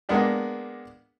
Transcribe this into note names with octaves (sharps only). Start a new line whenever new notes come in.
G#3 A#3 B3 D4 G4